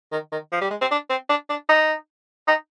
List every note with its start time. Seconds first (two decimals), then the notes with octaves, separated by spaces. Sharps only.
0.12 D#3
0.32 D#3
0.52 F3
0.61 G3
0.70 G#3
0.81 C4
0.91 D4
1.10 C4
1.29 D4
1.49 D4
1.69 D#4
2.48 D#4